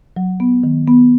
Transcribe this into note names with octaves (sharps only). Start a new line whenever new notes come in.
F#3
B3
D#3
B3